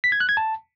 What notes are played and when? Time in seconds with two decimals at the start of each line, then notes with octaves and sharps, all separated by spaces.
0.04 B6
0.12 G#6
0.20 F#6
0.29 G#6
0.37 A5